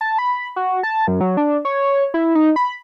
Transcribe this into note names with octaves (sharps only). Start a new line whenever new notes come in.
A5
B5
F#4
A5
F#2
F#3
D4
C#5
E4
D#4
B5